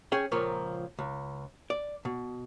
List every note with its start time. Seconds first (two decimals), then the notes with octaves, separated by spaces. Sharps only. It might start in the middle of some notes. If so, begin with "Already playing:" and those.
0.12 C#4 G#4 C#5 G5
0.32 C#2 A#2 F3 A#3 C#5
0.99 C#2
1.70 D5
2.05 B2